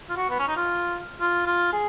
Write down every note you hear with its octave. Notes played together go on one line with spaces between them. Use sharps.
F4
F#4
B3
C#4
D#4
F4
F4
F4
G#4